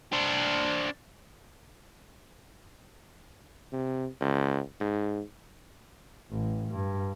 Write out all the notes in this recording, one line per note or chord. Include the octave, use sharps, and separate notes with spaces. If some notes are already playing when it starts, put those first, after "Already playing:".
D4 C5
C3
C#2
G#2
A1
G2